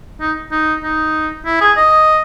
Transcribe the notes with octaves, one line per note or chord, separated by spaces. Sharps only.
D#4
D#4
D#4
E4
G#4
D#5